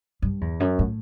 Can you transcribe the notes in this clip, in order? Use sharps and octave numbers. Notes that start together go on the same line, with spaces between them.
G2
E2
F#2
A2